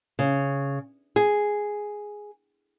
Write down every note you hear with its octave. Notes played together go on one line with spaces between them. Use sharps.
C#3
G#4